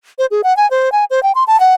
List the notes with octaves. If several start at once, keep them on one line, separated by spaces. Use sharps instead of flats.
C5
G#4
F#5
G#5
C5
G#5
C5
G5
C6
A5
F#5